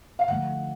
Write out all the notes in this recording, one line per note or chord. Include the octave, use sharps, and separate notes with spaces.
F5
D3 F3 A3 F#5